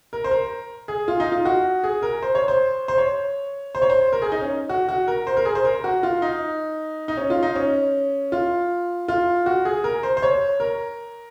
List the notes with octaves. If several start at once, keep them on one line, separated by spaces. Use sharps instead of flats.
A#4
C5
A#4
G#4
F4
D#4
F4
F#4
G#4
A#4
C5
C#5
C5
C5
C#5
C5
C#5
C5
A#4
G#4
D#4
C#4
F#4
F#4
A#4
C5
A#4
G#4
C5
A#4
F#4
F4
D#4
D#4
C#4
F4
D#4
C#4
F4
F4
F#4
G#4
A#4
C5
C5
C#5
A#4